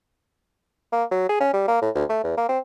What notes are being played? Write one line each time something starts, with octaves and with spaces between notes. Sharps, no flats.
A#3
F#3
G#4
C#4
G3
A#3
A2
D2
A3
E2
A#3
C4